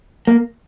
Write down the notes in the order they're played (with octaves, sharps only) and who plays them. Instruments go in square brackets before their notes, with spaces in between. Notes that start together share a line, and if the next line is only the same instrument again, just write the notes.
[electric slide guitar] A#3